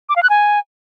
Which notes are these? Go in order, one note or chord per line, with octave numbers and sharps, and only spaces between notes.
D6
F5
F#6
G#5